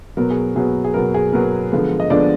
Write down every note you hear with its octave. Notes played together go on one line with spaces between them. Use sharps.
B2 F#3 B3 A#4
G#4
B2 F#3 B3 G#4
G#4
B2 F#3 B3 A#4
G#4
B2 F#3 B3 A#4
D3 F3 G#3 B3
D#5
D3 F3 G#3 B3 D4 D5